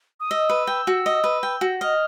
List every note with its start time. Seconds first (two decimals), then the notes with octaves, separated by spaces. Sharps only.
0.20 D#6
0.31 D#5 E6
0.49 B4
0.67 G5
0.87 F#4
1.06 D#5
1.24 B4
1.43 G5
1.61 F#4
1.81 D#5 F6